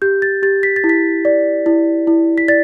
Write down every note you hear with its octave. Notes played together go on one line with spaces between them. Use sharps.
G4 G6
A6
G4 A6
B6
A6
E4
B6
D5
E4
E4
B6
D5 A6